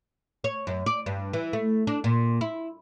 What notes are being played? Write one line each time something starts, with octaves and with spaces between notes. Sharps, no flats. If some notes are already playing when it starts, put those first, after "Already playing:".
C#5
F#2
D5
G2
E3
A3
D4
A#2
E4